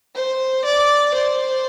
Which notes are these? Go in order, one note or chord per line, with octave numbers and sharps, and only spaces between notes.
C5
D5
C5